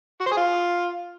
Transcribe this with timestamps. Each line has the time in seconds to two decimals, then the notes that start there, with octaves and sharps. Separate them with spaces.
0.21 F#4
0.26 C5
0.31 G#4
0.37 F4